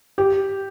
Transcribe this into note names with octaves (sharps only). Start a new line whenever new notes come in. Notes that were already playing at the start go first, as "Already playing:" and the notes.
G4